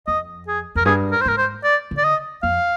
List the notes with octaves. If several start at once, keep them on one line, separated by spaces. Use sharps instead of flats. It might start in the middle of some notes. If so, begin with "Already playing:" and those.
F2 D#5
G#4
F2 A#4
G2 G#4
A#4
C5
G#2 A#4
C5
D5
D3
D5
D#5
F2 F5